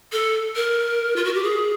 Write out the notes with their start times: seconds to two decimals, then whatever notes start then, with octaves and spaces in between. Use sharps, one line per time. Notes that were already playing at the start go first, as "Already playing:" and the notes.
0.12 A4
0.55 A#4
1.16 F4
1.25 F#4
1.34 G4
1.43 G#4